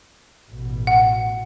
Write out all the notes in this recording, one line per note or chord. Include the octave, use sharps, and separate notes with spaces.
A1 B2
F#5